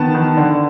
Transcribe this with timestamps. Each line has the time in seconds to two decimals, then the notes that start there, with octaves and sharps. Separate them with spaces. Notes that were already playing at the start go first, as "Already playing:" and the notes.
Already playing: D#3 B3 A5
0.15 D#3
0.37 D3